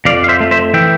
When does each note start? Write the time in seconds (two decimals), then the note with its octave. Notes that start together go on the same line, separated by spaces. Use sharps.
0.05 F2 D5 F5
0.24 F5
0.29 C5 E5
0.40 A3
0.51 C5 E5
0.74 E3 E5 G5